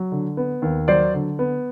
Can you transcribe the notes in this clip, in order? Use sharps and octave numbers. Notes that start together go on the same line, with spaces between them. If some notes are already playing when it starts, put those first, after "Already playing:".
Already playing: F#3
D3
B3
D#2
F#3 C5 D5
D3
B3